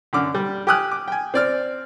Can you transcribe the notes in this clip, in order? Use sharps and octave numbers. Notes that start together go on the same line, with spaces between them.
F#2 D3 D6 F6
G3
G4 G5 G#5 D#6 F6 F#6
D6
G5 G#5
C4 D5 F6